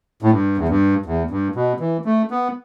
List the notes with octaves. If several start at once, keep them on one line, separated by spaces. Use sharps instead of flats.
A2
G2
E2
G2
E2
G2
B2
E3
A3
B3